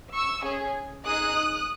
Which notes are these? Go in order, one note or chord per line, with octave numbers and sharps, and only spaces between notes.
C#6 E6
C#4 G#4
D#4 G#4 D#6 F#6